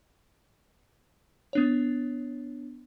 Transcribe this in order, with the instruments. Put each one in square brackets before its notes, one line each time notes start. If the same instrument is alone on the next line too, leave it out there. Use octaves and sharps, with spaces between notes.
[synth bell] B3 D4 C#5